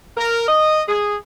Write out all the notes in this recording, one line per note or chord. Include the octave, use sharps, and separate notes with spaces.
A#4
D#5
G#4